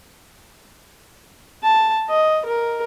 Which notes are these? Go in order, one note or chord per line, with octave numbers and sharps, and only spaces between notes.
A5
D#5
A#4